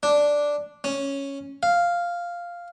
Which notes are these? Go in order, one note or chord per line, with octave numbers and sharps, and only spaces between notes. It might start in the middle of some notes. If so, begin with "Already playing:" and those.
D4
C#4
F5